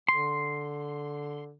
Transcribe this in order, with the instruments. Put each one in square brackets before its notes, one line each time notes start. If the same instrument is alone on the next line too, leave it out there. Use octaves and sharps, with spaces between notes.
[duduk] D3 [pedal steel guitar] C6